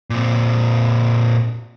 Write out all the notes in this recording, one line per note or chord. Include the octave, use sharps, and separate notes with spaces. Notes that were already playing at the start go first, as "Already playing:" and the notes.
A#2 C4